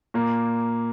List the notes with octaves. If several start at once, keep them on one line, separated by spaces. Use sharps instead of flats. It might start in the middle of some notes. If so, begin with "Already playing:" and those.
A#2 A#3